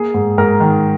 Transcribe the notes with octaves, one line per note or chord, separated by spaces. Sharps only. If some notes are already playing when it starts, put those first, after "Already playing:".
Already playing: A#3 G#4
G#2
G#2 A#4
D#3